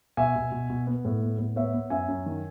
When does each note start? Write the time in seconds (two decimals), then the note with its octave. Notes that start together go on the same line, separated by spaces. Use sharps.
0.17 B2 E5 G#5
0.36 B2
0.52 B2
0.70 B2
0.87 B3
1.05 A2
1.22 B3
1.39 A2
1.56 B3 C#5 E5
1.74 B3
1.90 F#2 E5 G#5
2.08 F#2
2.26 D#3